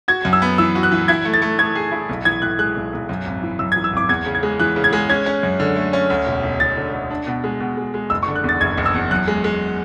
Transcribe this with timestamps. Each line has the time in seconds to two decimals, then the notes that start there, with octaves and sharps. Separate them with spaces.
0.08 F#4 G#6
0.25 F#2
0.33 E6
0.42 B3
0.58 E3 E6
0.75 F#4
0.83 F#6
0.92 E3
1.08 E4 G#6
1.25 A3
1.34 A6
1.42 A3
1.59 A3 G#6
1.75 G#4
1.92 E4
2.09 B1
2.25 E3 G#6
2.42 A2 F#6
2.59 G#3 F#6
2.76 B1
2.93 B1
3.09 F#2
3.26 G#1
3.42 E3
3.59 F#2 E6
3.72 G#6
3.76 E3
3.84 E6
3.93 G#1 D6
4.09 E2 G#6
4.26 C#3
4.35 G#6
4.43 G#3
4.59 E3 F#6
4.76 C#3
4.84 G#6
4.93 G#3
5.09 C#4 G#6
5.26 C#4
5.43 F#2
5.60 D3
5.76 A3
5.93 C#4
6.10 D2
6.27 E1
6.43 E1
6.60 E1 A6
6.77 D3
6.93 D2
7.10 D4
7.27 B2
7.44 G#3
7.60 B2
7.77 G#3
7.94 G#3
8.10 F#1 E6
8.23 C#6
8.28 D3
8.36 F#6
8.44 E2 A6
8.61 F#1 G#6
8.78 F#1
8.86 E6
8.94 E2
9.11 F#2 F#6
9.28 G#3
9.44 G#3